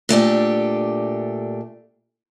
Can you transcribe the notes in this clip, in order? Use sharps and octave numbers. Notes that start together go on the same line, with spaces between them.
A#2 A3 D4 G4